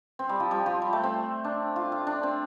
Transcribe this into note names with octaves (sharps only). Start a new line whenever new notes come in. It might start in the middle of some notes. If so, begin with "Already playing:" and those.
C4
G3
F3
G3
F3
G3
A3
C4
D4
F4
F4
D4
C4